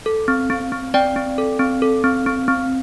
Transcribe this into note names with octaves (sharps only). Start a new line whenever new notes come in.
A4
C4
C4
C4
C4 D5 G5
C4
A4
C4
A4
C4
C4
C4